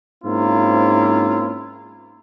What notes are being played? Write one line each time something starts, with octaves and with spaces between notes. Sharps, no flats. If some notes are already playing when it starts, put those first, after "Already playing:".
G#2 A#3 C4 C#4 E4 F4